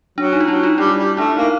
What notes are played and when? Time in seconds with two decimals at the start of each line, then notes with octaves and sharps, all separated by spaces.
0.18 F#3 D4
0.33 D#4
0.40 F4
0.48 F#3 D4 E4
0.63 D#4 F4
0.78 G3 D4 E4
0.98 G3
1.17 A3 D4 E4
1.37 A#3 D#4